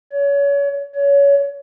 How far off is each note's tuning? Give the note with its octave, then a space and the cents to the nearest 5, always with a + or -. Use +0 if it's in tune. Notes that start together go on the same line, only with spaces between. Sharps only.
C#5 +30
C#5 +25